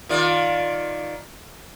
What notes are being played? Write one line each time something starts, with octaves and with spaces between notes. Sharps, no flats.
D#3 F4 D5